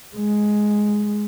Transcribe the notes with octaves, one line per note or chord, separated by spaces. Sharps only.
G#3